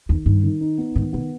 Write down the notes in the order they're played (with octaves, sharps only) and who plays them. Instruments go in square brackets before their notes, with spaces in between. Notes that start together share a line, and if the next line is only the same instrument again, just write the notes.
[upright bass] E2 [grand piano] D#3
[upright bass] G2 [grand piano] D#3
[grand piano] D#3
D#4
B3
[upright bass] G#2 [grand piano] D#3
[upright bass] B2 [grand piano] B3